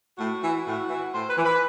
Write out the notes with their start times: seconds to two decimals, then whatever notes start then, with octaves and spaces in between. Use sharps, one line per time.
0.18 A2 F#4
0.41 E3
0.65 A2
0.89 E3
1.12 A2 C5
1.29 B4
1.37 E3
1.44 B4